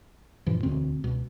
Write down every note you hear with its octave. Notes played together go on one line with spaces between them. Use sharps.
G2 A#2 E3 F3
E1 D2 C4
C#2 B2